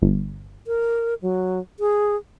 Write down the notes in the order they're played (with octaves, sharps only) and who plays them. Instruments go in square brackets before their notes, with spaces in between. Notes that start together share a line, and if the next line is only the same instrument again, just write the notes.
[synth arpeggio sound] G1
[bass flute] A#4
F#3
G#4